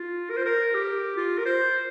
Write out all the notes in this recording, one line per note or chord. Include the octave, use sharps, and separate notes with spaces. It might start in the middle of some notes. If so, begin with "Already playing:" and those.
Already playing: F4
A#4
C5
A#4
G4
F4
A#4
C5